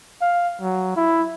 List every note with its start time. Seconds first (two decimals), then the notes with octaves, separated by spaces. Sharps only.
0.21 F5
0.61 F#3
0.96 E4